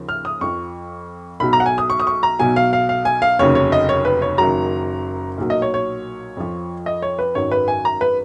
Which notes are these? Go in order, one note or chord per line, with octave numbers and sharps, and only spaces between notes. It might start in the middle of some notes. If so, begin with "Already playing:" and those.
Already playing: D#2 C#3 F3
F6
D#6
F2 F3 C#6
B1 B2 F#3 B5
A#5
F#5
G#5
D#6
C#6
D#6
C#6
A#5
B1 B2 F#3 G#5
F5
F5
F5
G#5
F5
F1 D#2 C#3 F#3 C#5
C#5
D#5
C#5
B4
C#5
F#1 F#2 D#3 F#3 A#5
B1 A#2 F#3
D#5
C#5
C#5
F2 F3
D#5
C#5
B4
G#1 F#2 D#3 F#3 C#5
B4
G#5
A#5
B4